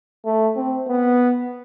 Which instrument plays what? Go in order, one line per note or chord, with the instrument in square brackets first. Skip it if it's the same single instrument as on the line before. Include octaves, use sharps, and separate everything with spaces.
[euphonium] A3
C4
B3